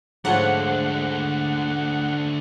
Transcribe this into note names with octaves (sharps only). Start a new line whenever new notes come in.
G#2 D3 F3 A3 C#5 F#5